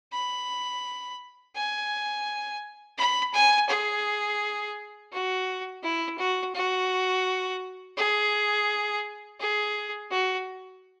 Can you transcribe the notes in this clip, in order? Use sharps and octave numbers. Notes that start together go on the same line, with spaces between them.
B5
G#5
B5
G#5
G#4
F#4
E4
F#4
F#4
G#4
G#4
F#4